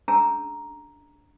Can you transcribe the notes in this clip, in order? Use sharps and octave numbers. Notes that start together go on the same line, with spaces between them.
C#4 D4 G#4 A5 A#5 E6